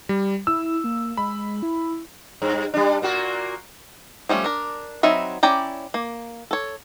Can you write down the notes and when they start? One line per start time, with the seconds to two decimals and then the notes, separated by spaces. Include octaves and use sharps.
0.09 G3
0.47 E4 E6
0.84 A#3
1.17 G#3 B5
1.63 E4
2.42 G2
2.74 G3 D4
3.02 A#2 A#3 F#4
4.29 F3 G3 A3 C#4
4.44 D4 A#4
5.03 F#3 C4 D#4 E5 B5
5.43 C#4 E4 D5 G5 A#5
5.94 A#3
6.51 A4 C#5